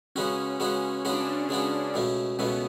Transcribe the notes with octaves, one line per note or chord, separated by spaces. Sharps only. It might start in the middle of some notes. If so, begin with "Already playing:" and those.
C#3 G#3 B3 C#4 F#4
C#3 G#3 B3 F#4
C#3 G#3 B3 C#4 F#4
D4
C#4
C#3 G#3 B3 F#4
C#2 B2 A3 C#4
C#2 B2 A3 B3 C#4